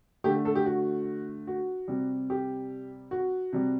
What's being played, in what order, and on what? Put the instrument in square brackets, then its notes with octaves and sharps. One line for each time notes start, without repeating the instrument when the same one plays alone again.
[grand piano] D3 A3 G4
A4
G4
F#4
F#4
C3 G3
G4
F#4
C3 G3